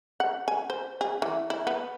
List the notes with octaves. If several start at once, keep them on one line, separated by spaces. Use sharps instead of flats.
F#5
G#5
C5
G#4
E3
E4
B3